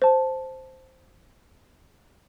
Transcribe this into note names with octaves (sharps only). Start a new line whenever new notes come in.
C5 A5